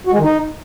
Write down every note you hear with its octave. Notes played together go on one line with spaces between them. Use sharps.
F#4
G#3
D#3
D#4